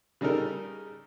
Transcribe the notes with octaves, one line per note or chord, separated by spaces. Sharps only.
C#3 G3 D#4 A4 A#4